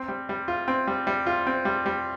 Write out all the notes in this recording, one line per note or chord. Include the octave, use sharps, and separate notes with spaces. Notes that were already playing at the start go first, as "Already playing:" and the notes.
Already playing: C4
G3
G3
F4
C4
G3
G3
F4
C4
G3
G3